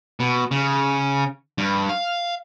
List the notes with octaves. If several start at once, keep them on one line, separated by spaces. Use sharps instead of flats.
B2
C#3
G2
F5